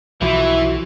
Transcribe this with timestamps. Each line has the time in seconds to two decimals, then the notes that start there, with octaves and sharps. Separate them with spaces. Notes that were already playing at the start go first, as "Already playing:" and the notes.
0.21 B1 E3 F3 E4 F#4